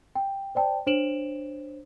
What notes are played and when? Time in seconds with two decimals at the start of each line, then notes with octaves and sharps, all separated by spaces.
0.15 G5
0.55 C5 D5 G5 A5
0.87 D4 C5 C#5 D7 E7 F#7